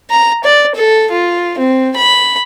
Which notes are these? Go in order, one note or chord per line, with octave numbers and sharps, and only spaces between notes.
A#5
D5
A4
F4
C4
B5